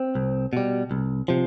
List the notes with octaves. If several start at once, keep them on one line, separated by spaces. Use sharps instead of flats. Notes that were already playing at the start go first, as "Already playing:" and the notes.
Already playing: C4
C2
B2 G3
C2
C3 F3